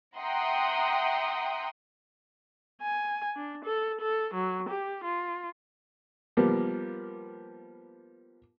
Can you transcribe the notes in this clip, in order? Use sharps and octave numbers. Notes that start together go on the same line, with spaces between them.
E5 F#5 G5 A#5 C6 D#6
G#5
D4
A4
A4
F#3
G4
F4
F3 G3 A#3 B3